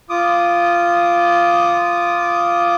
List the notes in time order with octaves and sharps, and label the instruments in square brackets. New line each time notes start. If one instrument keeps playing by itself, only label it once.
[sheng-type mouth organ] F4 D6 D#6